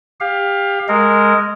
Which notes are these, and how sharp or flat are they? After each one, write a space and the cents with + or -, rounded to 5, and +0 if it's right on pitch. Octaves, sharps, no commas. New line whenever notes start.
G4 +25 F5 +15
G#3 +0 A#4 -15